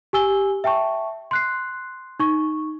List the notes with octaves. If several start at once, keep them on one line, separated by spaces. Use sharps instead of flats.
G4 G#5 E6 G7
E5 G5 A5 C#6
C6 F#6 C7
D#4 C#6